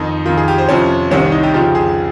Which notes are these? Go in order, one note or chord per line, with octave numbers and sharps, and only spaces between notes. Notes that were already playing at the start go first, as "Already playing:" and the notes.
Already playing: F2 D#3 D#4
F2 D#3 F4
G#4
G4
C5
F2 C3 F3 C#4
C2 C3 D#3 C#4
C#4
D#4
G4
F2 C#3 F3 G4
G#4